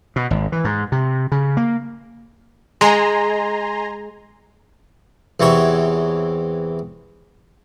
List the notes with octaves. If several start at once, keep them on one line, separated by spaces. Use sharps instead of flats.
B2
G#1
E3
G#2
C3
C#3
A#3
G#3 G#5 A#5 C6
E2 C3 E3 C#5